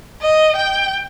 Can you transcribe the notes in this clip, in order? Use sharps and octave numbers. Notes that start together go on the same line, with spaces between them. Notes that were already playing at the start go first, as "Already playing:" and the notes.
D#5
G5